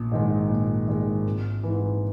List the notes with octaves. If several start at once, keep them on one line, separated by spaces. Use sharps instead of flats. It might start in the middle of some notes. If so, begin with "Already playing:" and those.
Already playing: A#1
G#2 D#3 G#3
A#1
G#2 D#3 G#3
G#1
G#2 E3